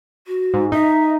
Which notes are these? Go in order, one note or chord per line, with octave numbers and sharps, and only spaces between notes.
F#4
G#2
D#4 E5